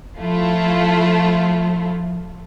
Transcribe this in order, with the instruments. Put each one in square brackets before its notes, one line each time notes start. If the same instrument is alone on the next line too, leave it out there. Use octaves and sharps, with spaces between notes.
[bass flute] F3 [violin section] A3 E4 F4